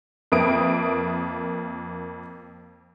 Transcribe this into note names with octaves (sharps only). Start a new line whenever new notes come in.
F2 A#3 B4 E5 D#6 D7